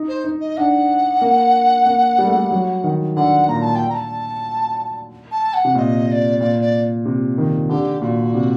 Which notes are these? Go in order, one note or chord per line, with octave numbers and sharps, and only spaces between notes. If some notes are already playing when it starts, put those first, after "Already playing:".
Already playing: D#4
C5
D#4
D#5
D4 F#5
A#3
A#3
G3
A3
G3
F#3
D#3
D3 F#5
A#2 A#5
A5
G5
A#5
A5
A5
F#5
C3
A#2 D#5 F#5
D#5
D5
A#2 D5
D5
C3
D#3
D3 G4
A#2 F#4
C3